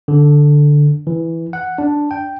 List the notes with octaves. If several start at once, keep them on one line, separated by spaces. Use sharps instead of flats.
D3
E3
F#5
D4
G5